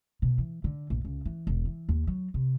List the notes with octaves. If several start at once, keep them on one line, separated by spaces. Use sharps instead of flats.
B2
E3
D3
A#1
C#2
E3
E1
E3
D#2
F#3
C3